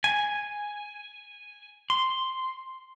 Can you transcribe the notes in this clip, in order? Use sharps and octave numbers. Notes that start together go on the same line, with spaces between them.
G#5
C6